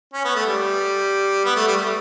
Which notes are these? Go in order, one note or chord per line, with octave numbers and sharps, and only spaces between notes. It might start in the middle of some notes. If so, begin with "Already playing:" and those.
C#4
B3
A3
G3
B3
A3
G3
A3